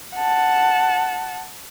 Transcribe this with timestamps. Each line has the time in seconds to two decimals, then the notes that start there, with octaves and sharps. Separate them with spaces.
0.16 F#5 A5